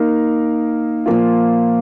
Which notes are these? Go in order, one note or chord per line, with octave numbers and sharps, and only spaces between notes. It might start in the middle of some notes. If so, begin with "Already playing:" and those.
Already playing: A#3 D#4 A#4 F5
A#2 F3 A#3 F4